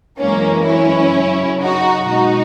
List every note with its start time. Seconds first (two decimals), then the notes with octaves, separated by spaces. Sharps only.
0.18 F#2 E3 G#3 A#3 C#4
0.66 C#4 E4
1.14 F#2 C#3 F#3
1.61 D#4 F#4
2.08 B2 G#3 D#4 F#4